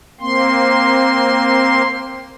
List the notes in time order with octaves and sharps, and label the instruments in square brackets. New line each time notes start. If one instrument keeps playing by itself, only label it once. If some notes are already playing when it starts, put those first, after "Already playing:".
[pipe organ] A#3 C4 C6